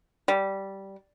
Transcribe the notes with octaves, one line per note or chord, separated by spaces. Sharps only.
G3